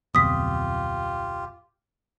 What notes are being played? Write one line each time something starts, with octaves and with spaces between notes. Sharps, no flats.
D1 F2 B2 F4 G4 D#6 B6